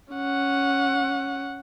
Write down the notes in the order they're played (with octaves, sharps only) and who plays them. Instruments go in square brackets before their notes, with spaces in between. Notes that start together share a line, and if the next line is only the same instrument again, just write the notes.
[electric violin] C#4 F#5